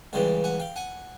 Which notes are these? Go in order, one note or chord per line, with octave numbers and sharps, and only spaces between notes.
C#2 C#3 E3 G3 F5 G5
F#5 G#5
F5 G5
F#5 G#5